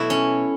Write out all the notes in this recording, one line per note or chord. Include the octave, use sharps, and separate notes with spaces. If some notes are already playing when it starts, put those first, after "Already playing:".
Already playing: B2 F#3 A3 E4 F#4
C#4